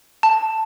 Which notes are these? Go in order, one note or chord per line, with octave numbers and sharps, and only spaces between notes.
A5